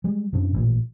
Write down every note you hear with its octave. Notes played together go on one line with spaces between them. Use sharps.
G3 G#3
F#2 B2 C#4 D4
A1 A#2